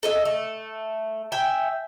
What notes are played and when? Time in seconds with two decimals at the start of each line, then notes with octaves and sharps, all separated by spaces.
0.03 A4 D#5 E5
0.25 A3
1.32 E5 G5 G#5